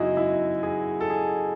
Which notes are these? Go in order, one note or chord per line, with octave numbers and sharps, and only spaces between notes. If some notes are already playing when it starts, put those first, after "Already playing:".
Already playing: F#2 C#3 G#3 B3 D#4 E4 F#4 G#4
E4
G#4
A4
G#4